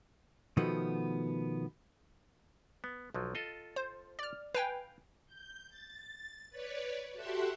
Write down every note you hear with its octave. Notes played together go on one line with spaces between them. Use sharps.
B2 D#3 F3 A3 B3
B3
B1 F3 F#3
F4 A4 D#5
C5
D5 F6
B4 F5 G5 G#5
G6
A6
B4 C#5 D5
F#4 G4 A4 E5 F#5 C6